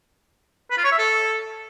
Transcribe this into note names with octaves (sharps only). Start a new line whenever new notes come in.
B4
F4
C#5
E5
A4